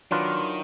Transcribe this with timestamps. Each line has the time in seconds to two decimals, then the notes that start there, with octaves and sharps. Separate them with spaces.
0.11 D#3 F#3 D4 F4 B4